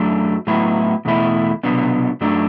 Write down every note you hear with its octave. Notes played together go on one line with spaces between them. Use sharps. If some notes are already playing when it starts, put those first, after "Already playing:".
Already playing: F#2 F#3 A3 D4
A2 F#3 B3 E4
E2 B2 A3 E4
C2 B2 F#3 B3 D4
F#2 F#3 A3 D4